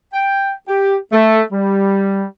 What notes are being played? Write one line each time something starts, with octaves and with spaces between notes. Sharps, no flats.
G5
G4
A3
G3